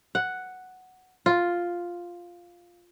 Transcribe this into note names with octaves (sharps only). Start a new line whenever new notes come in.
F#5
F4